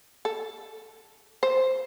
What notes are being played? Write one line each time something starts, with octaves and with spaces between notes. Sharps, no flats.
A4
C5